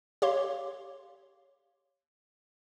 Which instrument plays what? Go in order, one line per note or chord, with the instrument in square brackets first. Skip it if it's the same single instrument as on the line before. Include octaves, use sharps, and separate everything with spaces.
[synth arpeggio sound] G4 C#5 F5 C6